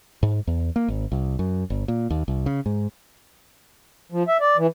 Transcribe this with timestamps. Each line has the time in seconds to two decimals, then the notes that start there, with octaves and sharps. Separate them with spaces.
0.23 G#2
0.47 E2
0.76 A#3
0.88 G#1
1.12 C2
1.39 F#2
1.70 G1
1.88 A#2
2.10 D#2
2.28 C2
2.46 C#3
2.66 G#2
4.12 F3
4.28 E5
4.40 D5
4.57 E3